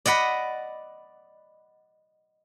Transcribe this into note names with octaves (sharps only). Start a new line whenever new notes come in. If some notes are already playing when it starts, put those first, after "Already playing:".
D5 D#5 F#5 B5